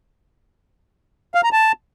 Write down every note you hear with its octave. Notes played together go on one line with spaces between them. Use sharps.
F5
A#5
A5